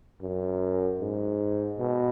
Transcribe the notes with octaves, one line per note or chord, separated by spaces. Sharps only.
F#2
G#2
B2